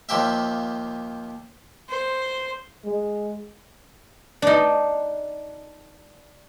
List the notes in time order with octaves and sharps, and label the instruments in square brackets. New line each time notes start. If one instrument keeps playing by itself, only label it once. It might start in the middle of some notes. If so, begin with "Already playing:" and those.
[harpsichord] D#2 F3 G4 E5
[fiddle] C5
[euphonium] G#3
[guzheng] D4 D#4